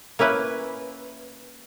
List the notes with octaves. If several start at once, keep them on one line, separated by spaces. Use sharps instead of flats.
A#3 C#4 E4 B4